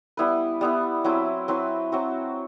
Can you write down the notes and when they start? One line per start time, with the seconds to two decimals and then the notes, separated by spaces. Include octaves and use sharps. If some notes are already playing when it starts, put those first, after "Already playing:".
0.17 G3 B3 E4 B4
0.61 G3 B3 E4 B4
1.04 F#3 C4 E4 B4
1.48 F#3 C4 E4 B4
1.92 F#3 C4 F#4